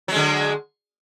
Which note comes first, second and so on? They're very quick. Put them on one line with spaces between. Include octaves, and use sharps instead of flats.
F#3 G#3 D3